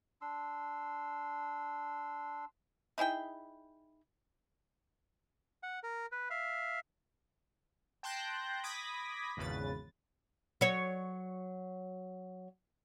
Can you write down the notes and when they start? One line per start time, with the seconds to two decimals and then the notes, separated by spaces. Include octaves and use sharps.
0.21 D4 C6 E6
2.98 D#4 E4 G#4 G5
5.63 F#5
5.83 A#4
6.12 B4
6.30 E5 F5
8.03 G5 A5 C6 F#6 G6 A#6
8.63 B5 D6 D#6 G#6 A#6 B6
9.37 G#1 E2 C#3 B4 A6
10.61 F#3 C#5